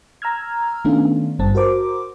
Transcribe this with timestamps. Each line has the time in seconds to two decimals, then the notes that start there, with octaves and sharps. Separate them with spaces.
0.22 A#5 E6 F6 G#6
0.85 D#3 A3 B3 C#4 D4 F4
1.39 G#1 G2 C4 A5
1.55 F#4 A#4 C5 D6